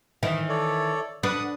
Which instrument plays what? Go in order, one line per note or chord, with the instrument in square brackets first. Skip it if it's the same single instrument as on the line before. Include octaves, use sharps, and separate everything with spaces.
[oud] D#3 E3
[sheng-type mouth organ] A4 C#5 D5
[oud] D4 B4 [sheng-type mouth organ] F#5 D#6